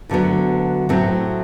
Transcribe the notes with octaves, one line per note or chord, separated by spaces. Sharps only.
D2 D3 F#3 B3
A2 F#3 A3 C4